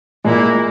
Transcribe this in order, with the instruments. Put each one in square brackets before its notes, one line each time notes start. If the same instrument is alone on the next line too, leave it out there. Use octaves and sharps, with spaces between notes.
[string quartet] A#2 A#3 E4 [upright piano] G#3